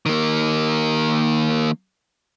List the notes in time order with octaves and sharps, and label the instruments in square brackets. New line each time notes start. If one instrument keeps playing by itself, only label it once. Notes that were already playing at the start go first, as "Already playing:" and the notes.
[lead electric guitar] D#3 A#3